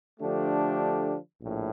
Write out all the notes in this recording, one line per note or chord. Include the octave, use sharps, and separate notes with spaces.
D3 F3 A3 D4 G4
A#1 A2